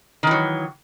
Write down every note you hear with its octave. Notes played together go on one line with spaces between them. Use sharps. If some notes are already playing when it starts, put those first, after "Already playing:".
D#3 E3 F#3